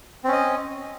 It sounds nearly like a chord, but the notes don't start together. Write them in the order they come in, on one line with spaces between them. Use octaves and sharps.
C4 C#4 D#5